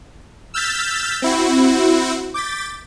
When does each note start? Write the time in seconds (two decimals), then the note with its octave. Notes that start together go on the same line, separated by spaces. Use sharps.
0.54 E6 F6 G6 A6 B6
1.22 C4 E4 F#4
2.34 D6 G6 A6 B6